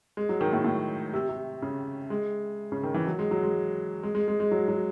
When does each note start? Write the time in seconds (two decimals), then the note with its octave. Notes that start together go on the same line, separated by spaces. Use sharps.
0.17 G#3
0.29 F#3
0.41 D#3
0.53 A2
0.65 A2
1.14 C3
1.29 C3
1.62 C#3
2.10 G#3
2.72 C#3
2.83 D#3
2.94 E3
3.06 F#3
3.19 G#3
3.31 F#3
3.43 G#3
4.03 G#3
4.15 G#3
4.28 G#3
4.40 G#3
4.51 F#3
4.68 F#3